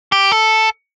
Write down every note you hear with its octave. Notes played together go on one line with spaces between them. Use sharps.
G4
A4